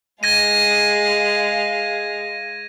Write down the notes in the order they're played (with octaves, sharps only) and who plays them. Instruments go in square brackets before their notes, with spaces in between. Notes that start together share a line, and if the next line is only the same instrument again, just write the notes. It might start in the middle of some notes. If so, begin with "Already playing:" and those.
[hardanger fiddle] G#3 F5 [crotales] G#6 A#6 D#7